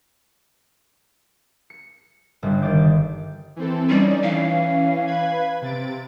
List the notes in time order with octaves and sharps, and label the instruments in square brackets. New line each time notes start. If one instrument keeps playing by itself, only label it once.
[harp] C#7
G1 C#3 G3
D#3 D5 D6 G6
[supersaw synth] E3 C4 A4
[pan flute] G3 [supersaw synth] C#4 D#4 D5
[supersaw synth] E3 C#4 [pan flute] F5
[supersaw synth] B4 B5 G#6
C3 A6 D7